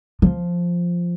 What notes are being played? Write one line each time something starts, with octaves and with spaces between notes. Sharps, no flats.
F3